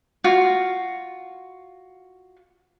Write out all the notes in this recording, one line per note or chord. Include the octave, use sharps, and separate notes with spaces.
F4 F#4